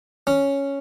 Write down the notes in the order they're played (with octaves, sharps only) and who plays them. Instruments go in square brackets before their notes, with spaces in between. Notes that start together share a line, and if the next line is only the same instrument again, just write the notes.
[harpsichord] C#4